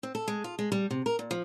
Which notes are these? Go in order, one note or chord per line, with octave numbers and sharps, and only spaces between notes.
C4
A4
G#3
F4
G#3
G3
C3
A#4
A#2
F3